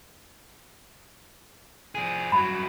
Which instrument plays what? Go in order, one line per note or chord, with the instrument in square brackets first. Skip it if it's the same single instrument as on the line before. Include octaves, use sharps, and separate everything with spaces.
[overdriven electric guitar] F3 G#4
[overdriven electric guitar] G2 F#3 [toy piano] B5